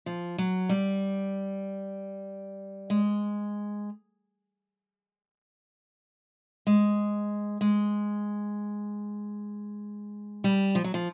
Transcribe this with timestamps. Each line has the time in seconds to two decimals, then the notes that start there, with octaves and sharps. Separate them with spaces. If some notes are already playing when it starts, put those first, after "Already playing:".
0.06 F3
0.38 F#3
0.69 G3
2.90 G#3
6.67 G#3
7.61 G#3
10.44 G3
10.75 F3
10.84 F#3
10.94 F3